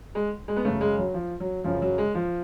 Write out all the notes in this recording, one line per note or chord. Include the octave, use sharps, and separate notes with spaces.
G#3
G#3
B3
F#2 C#3 A3
G#3
F#3
F3
F#3
F#2 C#3 F3
F#3
G#3
F3